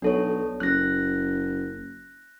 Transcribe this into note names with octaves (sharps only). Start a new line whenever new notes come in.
B1 D4 A4 C#5
F#1 F#6 A#6